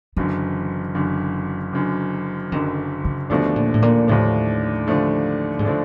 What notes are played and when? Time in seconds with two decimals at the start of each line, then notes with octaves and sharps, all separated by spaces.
0.17 F#1 F#2 D3 E3
0.95 F#1 F#2 D3
1.73 F#1 F#2 D3
2.52 F#1 F#2 D3 D#3
3.05 C#3
3.30 D#2 B2 D3 F3 A3 D4
3.56 A#2
3.74 A2
3.82 A#2
4.08 D#2 A2 D3 F3 A3 D4
4.87 D#2 D3 F3 A3 D4
5.59 G#2
5.65 D3 F3 A3 D4